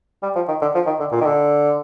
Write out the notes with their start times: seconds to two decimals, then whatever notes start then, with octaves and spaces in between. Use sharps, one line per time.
0.23 G3
0.36 F3
0.49 D#3
0.62 D3
0.75 F3
0.86 D#3
1.00 D3
1.12 A#2
1.21 D#3
1.26 D3